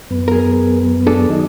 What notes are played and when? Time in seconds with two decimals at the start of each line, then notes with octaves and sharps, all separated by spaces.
0.10 F#2 B3
0.28 G#4 A#4
1.07 D4 G#4 A4
1.30 D#3 F#3 D#4